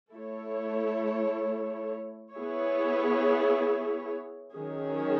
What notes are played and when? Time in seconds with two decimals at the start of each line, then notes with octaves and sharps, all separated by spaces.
0.14 A3 E4 A4 C#5
2.34 B3 E4 G#4 C#5
4.54 D#3 F#3 C#4 G#4